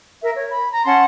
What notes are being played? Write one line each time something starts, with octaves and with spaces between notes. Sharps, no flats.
A#4 E5
C#5
B5
A#5
C#4 F#5 A5 C6